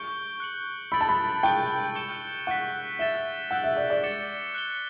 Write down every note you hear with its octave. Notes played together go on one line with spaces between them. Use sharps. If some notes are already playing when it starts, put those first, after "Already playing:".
Already playing: C#6 G6 D7 G7
F#6 C#7 F#7
B5 E6 A6 D7 F#7
A5
B5
G5 C#6 G6 D7
C#6 G6 C#7 E7 G7
F#5 C#6 F#6 B6
E5 A6 E7 G7
F#5 E6 G6 D7 G7
E5
D5
D5
D6 A6 C#7 E7 G7
F#6 C#7 G7